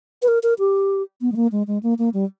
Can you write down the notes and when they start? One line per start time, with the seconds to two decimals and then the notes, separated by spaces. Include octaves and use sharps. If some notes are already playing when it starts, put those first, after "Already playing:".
0.22 B4
0.28 A#4
0.43 A#4
0.59 G4
1.21 B3
1.32 G#3
1.36 A#3
1.52 G#3
1.67 G#3
1.83 A#3
1.98 A#3
2.14 G3